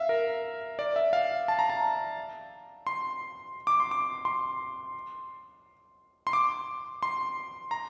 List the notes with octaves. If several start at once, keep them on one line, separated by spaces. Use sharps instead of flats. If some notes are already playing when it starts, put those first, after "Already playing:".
Already playing: E5 F5
A#4
D5
E5
F5
A5
A#5
A5
C6
D6
C6
D6
C6
C6
D6
C6
A#5